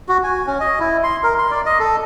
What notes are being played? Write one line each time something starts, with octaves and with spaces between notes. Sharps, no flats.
F#4
G#5
C#4
D#5
E4
C6
A#4
C6
D5
D#5
A4